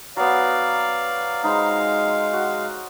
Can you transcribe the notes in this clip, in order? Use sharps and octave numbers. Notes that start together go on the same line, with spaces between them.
F#3 B3 D5 F5
G#3 D#4 C5 F5 B5
F#4